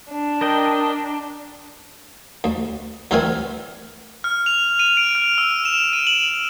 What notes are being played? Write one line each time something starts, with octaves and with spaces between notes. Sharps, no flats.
D4
A#4 D#5 G5
D2
D2 D3 E3 C4 A#4 G#5
F6
F7
D#7
D7
F6
E6
E7
D#7
F#7